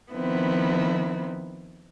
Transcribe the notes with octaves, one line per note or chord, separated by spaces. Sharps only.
D#3 F3 B3 C4 E4